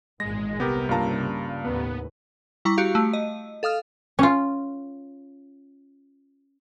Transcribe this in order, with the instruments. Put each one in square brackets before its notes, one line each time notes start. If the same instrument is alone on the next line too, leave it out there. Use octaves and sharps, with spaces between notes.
[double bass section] G#1 E2 A#2 [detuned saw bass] G#3 [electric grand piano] A#6
[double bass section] C2 [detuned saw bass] C3 [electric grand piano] B3 G4 A#4
[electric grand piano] G2 A#5 [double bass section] C#3 G3 [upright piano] A#3 F4 A5
[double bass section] D#2 A2 [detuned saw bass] B3 [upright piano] B4
[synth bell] G3 E4 A#5 C#6
F#4 G4 F5
A3
D#5
A4 F5 D#6 F6
[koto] C#4 F4